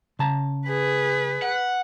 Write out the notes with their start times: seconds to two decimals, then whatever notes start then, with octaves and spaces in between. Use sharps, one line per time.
0.19 C#3 A5 A#5
0.68 G#4 B4
1.42 F#5